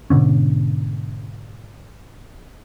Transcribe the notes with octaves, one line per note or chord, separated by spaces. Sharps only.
G#2 B2 D3 C#4